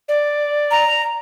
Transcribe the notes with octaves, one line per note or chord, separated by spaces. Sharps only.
D5
A#5